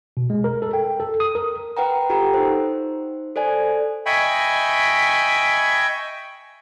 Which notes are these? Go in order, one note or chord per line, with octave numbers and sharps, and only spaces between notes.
B2
G#3
A#4
A4
G5
A4
D#6
A#4
B4 F#5 G5 A#5
F4 G4 A4 F#5 G5 A#5
D#4 C5
A4 C5 D5 G#5
D#5 E5 G5 G#5 B5 C#6